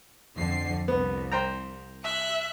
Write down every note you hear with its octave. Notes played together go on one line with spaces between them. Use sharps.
F2 D3 C7
C2 B3
C5 G5 A#5
E5 F#6